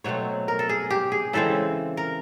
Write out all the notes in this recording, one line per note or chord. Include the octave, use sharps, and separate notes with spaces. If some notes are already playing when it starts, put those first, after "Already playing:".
B2 F#3 A3 C4 C#5
A#4
A4
G#4
G4
G#4
C#3 E3 G#3 C4 A4
A#4